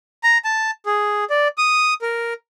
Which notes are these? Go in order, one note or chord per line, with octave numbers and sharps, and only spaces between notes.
A#5
A5
G#4
D5
D#6
A#4